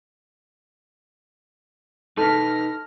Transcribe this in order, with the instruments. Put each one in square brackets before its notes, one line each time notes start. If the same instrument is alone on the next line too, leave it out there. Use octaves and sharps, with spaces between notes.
[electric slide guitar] D#4 B4 [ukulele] A4 [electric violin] F6 A#6